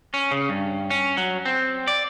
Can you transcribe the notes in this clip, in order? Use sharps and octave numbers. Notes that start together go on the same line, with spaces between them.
C#4
C#3
G2
C#4
F#3
C4
D5